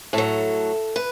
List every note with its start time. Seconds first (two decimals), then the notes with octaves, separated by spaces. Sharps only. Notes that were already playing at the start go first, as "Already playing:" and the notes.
0.13 A2 F#3 A4
0.96 B4